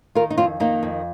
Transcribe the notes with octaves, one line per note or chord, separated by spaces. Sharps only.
D#3 F4 A#4
D#4
F2 C4 F4
D#3 A#3 D#4
F2